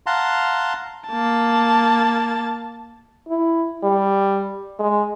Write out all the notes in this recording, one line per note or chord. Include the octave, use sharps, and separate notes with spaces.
F5 F#5 A5 A#5 C6
A#3 A5
E4
G3
G#3